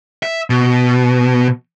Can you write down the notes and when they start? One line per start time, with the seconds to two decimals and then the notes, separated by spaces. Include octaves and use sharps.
0.23 E5
0.50 B2